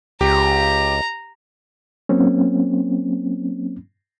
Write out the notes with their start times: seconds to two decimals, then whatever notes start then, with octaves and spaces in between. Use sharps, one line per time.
0.21 C#2 G4 A#5
2.09 F#3 A#3 C4 C#4